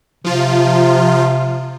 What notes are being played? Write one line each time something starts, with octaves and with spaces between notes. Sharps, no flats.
C3 F3 F4